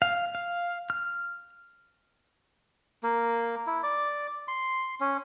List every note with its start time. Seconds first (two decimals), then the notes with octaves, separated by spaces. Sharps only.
0.02 F5
0.35 F5
0.90 F6
3.03 A#3
3.67 E4
3.83 D5
4.48 C6
5.00 C#4